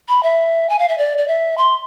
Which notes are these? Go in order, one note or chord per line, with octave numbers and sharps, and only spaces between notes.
B5
E5
G#5
F5
E5
D5
D5
E5
C6